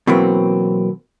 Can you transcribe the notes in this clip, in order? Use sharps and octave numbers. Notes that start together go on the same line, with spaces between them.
B2 E3 F#3 A#3 C4